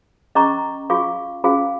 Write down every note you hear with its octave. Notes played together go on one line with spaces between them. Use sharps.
C#4 G#4 D#5 A#5 C#6
F4 G#4 F5 C#6
C#4 F4 G#4 F5